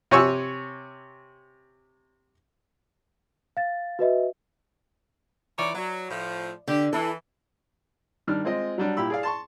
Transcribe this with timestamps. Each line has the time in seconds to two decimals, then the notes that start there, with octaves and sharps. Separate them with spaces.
0.11 C3 C#5 G#5 C#6 E6
3.57 F5 A6
3.99 F#4 B4 D#5 E5
5.59 E3 D#4 C#5 D5
5.74 F#3 D5
6.10 A2 F3
6.68 D3 G4
6.93 E3 E4 A4
8.27 D#3 G3 D4 F6
8.44 G#3 C4 F4 D#5
8.78 F#3 G3 D4
8.97 A#2 E4 G4 B5 E6
9.10 G#4 D5 F5
9.23 A5 C6 C#6